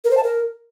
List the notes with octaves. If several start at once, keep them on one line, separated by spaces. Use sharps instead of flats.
A#4
C5
A5
A#4